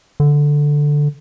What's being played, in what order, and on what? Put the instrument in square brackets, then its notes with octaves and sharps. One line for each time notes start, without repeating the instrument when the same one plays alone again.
[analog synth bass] D3